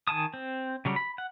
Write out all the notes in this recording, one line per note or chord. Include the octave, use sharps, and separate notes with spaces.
D#3 G#5 A5 D#6
C4
C#3 F#3 G3
B5
F#5